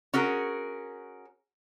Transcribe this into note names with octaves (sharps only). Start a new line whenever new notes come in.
C#4 F#4 G#4 A#4